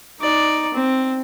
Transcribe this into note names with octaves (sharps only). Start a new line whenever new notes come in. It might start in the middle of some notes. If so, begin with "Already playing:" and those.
D#4 D5
C4